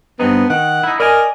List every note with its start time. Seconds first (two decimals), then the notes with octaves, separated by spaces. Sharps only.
0.20 G2 B3 C4 D#4
0.50 D#3 F#5
0.83 D#4 E4
1.00 A#4 D5 D#5 G#5